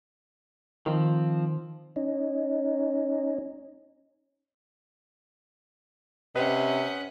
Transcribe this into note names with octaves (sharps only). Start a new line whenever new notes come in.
D#3 F3 C4
C#4 D#4
C3 C#4 B4 D#5 F#5